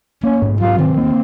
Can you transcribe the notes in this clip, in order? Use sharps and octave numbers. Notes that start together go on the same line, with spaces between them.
A#3 C#4
G#2
F#3 F4
D#3 C4
A#3